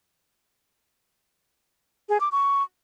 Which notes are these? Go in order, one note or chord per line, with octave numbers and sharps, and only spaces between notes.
G#4
D6
C#6